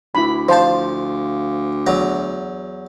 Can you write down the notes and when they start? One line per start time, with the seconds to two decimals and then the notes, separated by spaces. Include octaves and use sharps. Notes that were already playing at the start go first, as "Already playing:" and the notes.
0.15 D2 E4 B5
0.49 F3 F4 C5 A5
1.86 E2 F#3 A#5